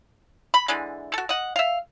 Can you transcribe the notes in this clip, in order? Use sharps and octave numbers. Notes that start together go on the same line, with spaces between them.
B5
D3 E3 G#3
F#4 A4
D#5 F#5
E5 F5